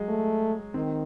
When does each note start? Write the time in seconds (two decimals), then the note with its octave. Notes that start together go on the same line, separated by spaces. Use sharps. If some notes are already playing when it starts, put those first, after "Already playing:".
Already playing: F#3 G#3
0.09 A3
0.74 D#3 C4